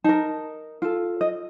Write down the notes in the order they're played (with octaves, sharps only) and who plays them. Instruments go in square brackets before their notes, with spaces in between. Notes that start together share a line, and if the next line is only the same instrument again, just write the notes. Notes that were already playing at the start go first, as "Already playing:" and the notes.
[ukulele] D#4 A#4 A5
F4 A4
D#5